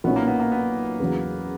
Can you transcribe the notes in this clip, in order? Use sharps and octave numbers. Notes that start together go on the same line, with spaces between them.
B1 A#2 F#3 B3 C#4 E4
A#3
B3
A#3
B3
E2 C#3 F#3